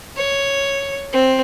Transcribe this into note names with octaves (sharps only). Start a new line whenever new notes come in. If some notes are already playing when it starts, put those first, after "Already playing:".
C#5
C4